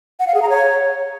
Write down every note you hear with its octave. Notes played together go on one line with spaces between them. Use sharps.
F#5
F5
G#4
A#5
C#5